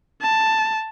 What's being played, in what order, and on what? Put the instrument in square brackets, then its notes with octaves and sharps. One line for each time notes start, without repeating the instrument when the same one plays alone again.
[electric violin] A5